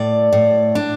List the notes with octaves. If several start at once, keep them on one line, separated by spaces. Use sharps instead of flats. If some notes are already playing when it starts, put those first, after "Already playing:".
Already playing: A2 D5
A2
D4